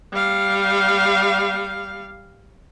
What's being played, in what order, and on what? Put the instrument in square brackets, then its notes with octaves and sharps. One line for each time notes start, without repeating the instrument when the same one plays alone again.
[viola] G3 F5